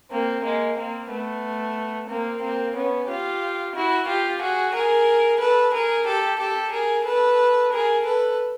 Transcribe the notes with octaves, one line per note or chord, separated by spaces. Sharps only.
A#3 C4
G#3 A#3
A#3 C4
A3 B3
A#3 C4
A#3 C4
B3 C#4
F4 G4
E4 F#4
F4 G4
F#4 G#4
G#4 A#4
A4 B4
G#4 A#4
G4 A4
G4 A4
G#4 A#4
A4 B4
G#4 A#4
A4 B4